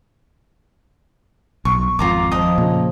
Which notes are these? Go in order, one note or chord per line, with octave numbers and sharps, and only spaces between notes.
B1 C#6
G#1 F2 F4 A#5 D6
F3 D#5 A#5 D#6
A#2 C#3